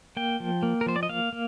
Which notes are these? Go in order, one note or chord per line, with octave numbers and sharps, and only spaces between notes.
A#3 G5
F3
A#3
A#4
F3 C5
D5
D#5
A#3 F5
A#3